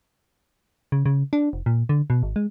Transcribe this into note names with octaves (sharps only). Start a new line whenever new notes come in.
C#3
C#3
D4
F1
A#2
D3
B2
G#1
G#3